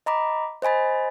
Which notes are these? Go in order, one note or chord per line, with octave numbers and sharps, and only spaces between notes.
D#5 A#5 B5 D6
C5 D#5 G#5 B5 A6